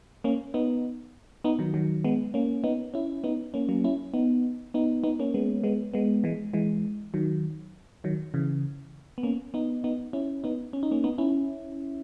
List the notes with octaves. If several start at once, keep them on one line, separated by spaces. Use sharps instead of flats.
A#3 C#4
B3 D#4
B3 D#4
D#3 F#3
D#3 F#3
G#3 B3
A#3 C#4
B3 D#4
C#4 E4
B3 D#4
A#3 C#4
F#3 A#3
C#4 E4
B3 D#4
B3 D#4
B3 D#4
A#3 C#4
G#3 B3
G#3 B3
G#3 B3
E3 G#3
E3 G#3
D#3 F#3
D#3 F#3
C#3 E3
B3
A#3 C#4
B3 D#4
B3 D#4
C#4 E4
B3 D#4
C#4
D#4
A#3 C#4
B3 D#4
C#4 E4